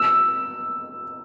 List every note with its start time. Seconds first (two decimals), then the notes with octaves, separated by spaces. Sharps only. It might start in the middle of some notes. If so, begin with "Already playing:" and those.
Already playing: E6